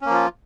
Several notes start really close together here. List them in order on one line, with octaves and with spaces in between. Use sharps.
C#4 A#3 F3 F4